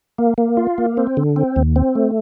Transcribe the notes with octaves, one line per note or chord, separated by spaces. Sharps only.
A#3
A#3
F4
A#3
C4
D3
C4
D#2
C4
A3